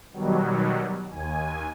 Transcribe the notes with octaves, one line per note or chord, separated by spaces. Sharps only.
B2 D#3 F#3 G3
D#2 G#5